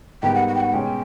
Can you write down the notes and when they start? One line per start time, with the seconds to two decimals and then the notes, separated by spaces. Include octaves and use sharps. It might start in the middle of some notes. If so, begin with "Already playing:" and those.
0.23 G#2 D#3 G3 B3 G5
0.35 F#5
0.48 F#5
0.55 G5
0.60 F#5
0.73 B2 G#3 C#4 G5